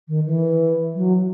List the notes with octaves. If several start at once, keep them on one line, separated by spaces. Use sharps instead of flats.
D#3
E3
F#3